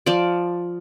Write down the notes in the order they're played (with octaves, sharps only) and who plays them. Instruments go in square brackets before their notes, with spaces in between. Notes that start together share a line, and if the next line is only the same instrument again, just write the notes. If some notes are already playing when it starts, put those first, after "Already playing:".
[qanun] F3 D5